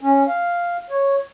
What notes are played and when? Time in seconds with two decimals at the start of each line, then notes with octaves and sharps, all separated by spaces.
0.01 C#4
0.28 F5
0.90 C#5